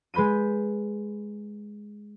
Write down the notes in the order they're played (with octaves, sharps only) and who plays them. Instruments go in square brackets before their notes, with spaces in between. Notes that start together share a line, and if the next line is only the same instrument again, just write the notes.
[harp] G#3 B4 B5 G6 D#7